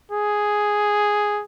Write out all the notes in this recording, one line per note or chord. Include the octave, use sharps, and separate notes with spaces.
G#4